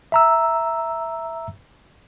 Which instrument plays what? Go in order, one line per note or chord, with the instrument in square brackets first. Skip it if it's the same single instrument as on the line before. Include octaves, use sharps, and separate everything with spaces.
[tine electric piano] E5 A#5 E6